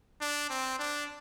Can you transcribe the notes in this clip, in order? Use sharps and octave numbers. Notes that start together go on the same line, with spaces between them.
D4
C4
D4